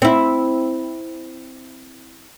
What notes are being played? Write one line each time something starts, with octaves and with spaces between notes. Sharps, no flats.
C4 E4